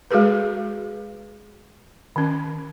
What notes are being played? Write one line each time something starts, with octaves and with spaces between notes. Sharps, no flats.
G#3 F#4 G#4 A4 B4
D#3 C#4